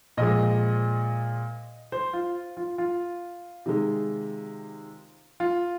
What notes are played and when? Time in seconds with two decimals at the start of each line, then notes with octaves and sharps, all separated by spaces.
0.17 A#2 F3 G#3 D#5
1.92 C5
2.13 F4
2.57 F4
2.78 F4
3.66 C3 D#3 G#3
5.40 F4